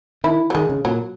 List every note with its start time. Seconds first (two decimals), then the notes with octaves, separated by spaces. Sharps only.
0.24 D#3 E4
0.50 F#3
0.55 D#3 G#3
0.70 C#3
0.85 A#2 F#3